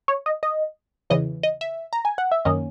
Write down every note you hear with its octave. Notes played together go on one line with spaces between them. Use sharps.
C#5
D#5
D#5
E2 C#3 E3 D#5
D#5
E5
A#5
G#5
F#5
E5
F#2 D#3 A#3 C#4 D#5